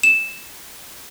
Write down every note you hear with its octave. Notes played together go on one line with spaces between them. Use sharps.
E7